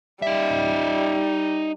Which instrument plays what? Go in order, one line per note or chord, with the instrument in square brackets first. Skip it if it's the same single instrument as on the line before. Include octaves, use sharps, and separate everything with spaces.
[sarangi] G3 [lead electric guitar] D#4 E5